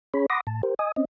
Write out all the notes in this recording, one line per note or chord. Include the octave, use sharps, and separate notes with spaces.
C#4 G#4 C#5 B5
F#5 B5 C6 D6 D#6 A#6
A2 A5
G4 A#4 C5
D#5 G#5 D#6
C4 C#4 D#5